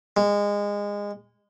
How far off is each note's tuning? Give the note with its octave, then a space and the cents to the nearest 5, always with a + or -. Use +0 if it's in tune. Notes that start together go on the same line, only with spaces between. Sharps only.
G#3 -25